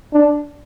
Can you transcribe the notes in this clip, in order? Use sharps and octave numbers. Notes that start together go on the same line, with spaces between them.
D4